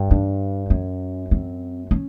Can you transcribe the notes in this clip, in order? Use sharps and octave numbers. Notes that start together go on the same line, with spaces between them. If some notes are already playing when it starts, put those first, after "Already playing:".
Already playing: G2
D4
F#2 C#4
C4
C#4